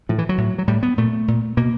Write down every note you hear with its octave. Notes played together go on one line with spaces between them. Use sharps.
A2 F3
E3
F#3
A2
F#3
A2 G3
B3
A#2 A3
A#2
B2 A#3